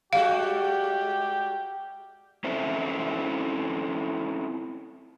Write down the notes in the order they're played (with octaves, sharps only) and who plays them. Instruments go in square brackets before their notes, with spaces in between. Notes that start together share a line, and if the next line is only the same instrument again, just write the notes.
[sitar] G3 G#3 F#4 [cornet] G4 [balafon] F5
[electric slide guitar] C4 C#4 E4 A4 C5 E5